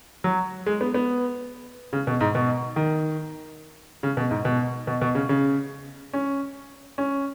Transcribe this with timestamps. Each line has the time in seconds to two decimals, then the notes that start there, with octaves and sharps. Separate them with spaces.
0.24 F#3
0.66 G#3
0.81 B3
0.94 B3
1.93 C#3
2.07 B2
2.21 G#2
2.35 B2
2.76 D#3
4.03 C#3
4.17 B2
4.31 G#2
4.45 B2
4.87 B2
5.02 B2
5.15 C#3
5.29 C#3
6.13 C#4
6.98 C#4